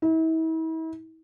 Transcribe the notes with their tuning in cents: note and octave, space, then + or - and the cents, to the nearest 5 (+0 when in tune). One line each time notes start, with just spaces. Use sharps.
E4 -40